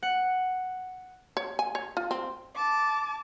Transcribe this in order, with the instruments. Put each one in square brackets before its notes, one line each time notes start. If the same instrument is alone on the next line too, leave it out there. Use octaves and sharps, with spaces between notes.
[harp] F#5
[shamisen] C#5
G#5
C#5
F4
C4
[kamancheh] A5 D6